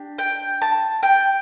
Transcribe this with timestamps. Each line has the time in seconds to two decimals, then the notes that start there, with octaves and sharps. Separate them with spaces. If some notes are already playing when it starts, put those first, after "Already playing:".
Already playing: D4 G4
0.18 G5
0.62 A5
1.03 G5